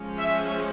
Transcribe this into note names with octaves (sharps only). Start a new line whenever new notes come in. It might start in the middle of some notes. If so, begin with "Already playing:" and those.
Already playing: F3 G#3 C#4
E5